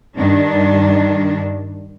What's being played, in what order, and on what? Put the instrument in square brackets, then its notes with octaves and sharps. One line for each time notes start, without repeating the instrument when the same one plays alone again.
[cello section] G2 D#3 D4